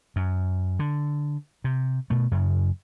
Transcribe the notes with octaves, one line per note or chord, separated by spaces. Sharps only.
F#2
D3
C3
B2 A3
F#2 C#3